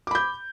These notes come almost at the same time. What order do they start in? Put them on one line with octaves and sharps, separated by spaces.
D6 B5 G6